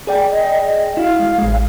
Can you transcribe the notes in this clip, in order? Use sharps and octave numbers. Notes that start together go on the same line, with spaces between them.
G#4 D5 G5
D#5
E4 F#4 F5
G#3
A1 G#3